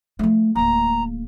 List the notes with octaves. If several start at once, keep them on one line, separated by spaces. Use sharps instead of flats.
F3 A3
D1 A#3 A#5